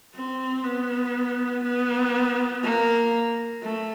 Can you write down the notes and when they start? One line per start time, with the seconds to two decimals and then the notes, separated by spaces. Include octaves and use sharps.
0.14 C4
0.64 B3
1.64 B3
2.63 A#3
3.63 A3